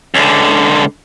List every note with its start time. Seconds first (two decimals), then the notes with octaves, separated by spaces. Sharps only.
0.14 C#2 D3